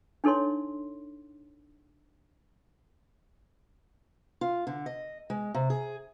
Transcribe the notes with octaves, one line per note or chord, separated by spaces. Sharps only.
D4 D#4 A4 C#5 C6
F4
D3
D#5
G#3
C3
G#4